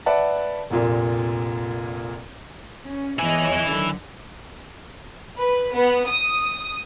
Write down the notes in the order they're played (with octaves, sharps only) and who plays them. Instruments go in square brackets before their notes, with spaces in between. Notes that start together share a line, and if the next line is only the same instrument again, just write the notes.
[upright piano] B4 D5 E5 F#5 A5
F1 A#1 A#2
[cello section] C#4
[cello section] E2 C#5 D#5 [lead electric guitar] E4 G#5
[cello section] D3 D#3 F#3
[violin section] B4
B3
D#6